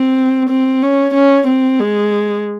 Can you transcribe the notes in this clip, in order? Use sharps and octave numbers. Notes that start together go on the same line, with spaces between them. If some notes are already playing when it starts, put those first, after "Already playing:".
Already playing: C4
C4
C#4
C#4
C4
G#3